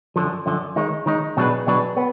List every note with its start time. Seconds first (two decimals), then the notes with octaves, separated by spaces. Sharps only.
0.16 F#2 D3 F3
0.46 F#2 D3 F3
0.76 D#3 G#3 D#4
1.06 D#3 G#3 D#4
1.37 B2 F#3 D4 G#4 B4
1.67 B2 F#3 D4 G#4 B4
1.97 B3